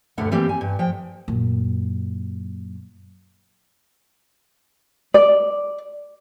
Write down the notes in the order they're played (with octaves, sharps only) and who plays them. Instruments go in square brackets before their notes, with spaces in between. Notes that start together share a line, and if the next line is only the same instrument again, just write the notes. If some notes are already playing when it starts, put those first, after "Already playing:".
[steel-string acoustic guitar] D2 G2 B2 D3 B3 F#5
E3 G3 A#3 C4 G4
G#5
G2
F3 G5
[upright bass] F#2 A#2
[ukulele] D5